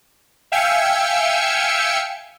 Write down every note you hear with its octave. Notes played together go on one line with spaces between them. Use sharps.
E5 F5 G5 G#5 E6 C#7